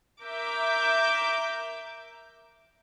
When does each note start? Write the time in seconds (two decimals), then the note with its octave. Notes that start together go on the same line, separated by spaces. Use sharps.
0.22 A#4 E5 D6 G6